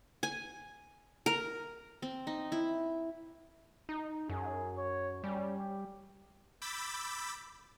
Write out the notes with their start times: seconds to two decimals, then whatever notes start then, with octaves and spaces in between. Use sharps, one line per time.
0.23 G#5
1.26 A#4
2.02 C4
2.27 D#4
2.52 E4
3.89 D#4
4.29 F#2 G#4
4.77 C#5
5.24 G3 C#4
5.58 G4
6.62 B5 D6 E6 G6 A6 B6